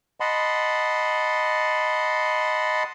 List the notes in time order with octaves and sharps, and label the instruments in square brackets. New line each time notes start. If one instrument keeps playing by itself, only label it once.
[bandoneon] D#5 F#5 A5 B5 C6